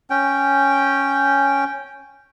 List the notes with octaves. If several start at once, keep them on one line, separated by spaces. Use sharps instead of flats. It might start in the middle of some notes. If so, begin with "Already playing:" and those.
C#4 G5